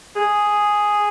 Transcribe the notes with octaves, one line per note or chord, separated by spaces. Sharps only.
G#4